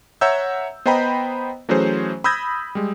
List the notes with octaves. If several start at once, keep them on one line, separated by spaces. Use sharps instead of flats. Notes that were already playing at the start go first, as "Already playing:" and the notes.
C#5 E5 F#5 A#5 E6 G6
B3 C5 D#5 G5 A#5 B5
E3 F#3 A3 C#4 G#4 C5
B5 D#6 E6 G6 G#6 A#6
G3 G#3